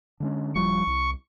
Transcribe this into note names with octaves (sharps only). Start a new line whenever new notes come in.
D3 G#3 C#4
D#1 F3 G3 C#6
C2